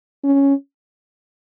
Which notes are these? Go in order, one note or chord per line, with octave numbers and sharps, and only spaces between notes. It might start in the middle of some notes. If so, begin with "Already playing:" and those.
C#4